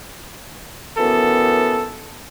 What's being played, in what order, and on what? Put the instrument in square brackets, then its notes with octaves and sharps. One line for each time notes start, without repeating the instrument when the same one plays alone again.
[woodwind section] F#2 E3 B3 [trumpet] A4